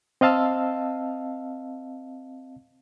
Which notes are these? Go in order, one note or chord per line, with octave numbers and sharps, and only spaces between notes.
C4 D#5 F5 A5 E6